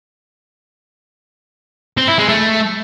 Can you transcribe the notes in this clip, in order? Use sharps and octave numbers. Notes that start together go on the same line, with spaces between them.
C4
E4
G#3
A3